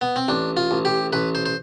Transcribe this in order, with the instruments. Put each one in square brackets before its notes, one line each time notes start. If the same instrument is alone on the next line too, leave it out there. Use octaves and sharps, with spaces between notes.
[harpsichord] B3
C4
A1 D4
F4
A1
G4
A1 B4
C5
C5